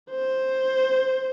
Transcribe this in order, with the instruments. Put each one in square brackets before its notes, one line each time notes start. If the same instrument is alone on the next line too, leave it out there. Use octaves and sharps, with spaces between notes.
[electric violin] C5